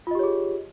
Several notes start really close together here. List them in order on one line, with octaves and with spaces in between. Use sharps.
F4 D#5 G4 C#5 G#4